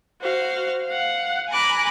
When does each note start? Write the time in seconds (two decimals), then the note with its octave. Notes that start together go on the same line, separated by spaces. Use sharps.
0.21 F#4 C5 F5
0.88 F5 F#5
1.50 G#5 A#5 B5 D6 F#6